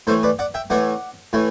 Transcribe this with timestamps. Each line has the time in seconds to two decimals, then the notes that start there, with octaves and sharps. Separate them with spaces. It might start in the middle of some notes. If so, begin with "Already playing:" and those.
0.07 A2 E3 A3 A4 C5
0.23 B4 D5
0.39 D5 F#5
0.54 E5 G5
0.70 A2 E3 A3 D5 F#5
1.33 A2 E3 A3